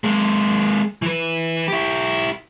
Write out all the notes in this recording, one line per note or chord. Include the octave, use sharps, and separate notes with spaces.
G#3 A#3
E3 B4
E4 G4